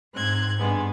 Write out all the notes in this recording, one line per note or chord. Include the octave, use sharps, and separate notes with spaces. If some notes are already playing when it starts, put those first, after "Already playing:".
G#2 C4 F#6 G#6
G2 G#3 B3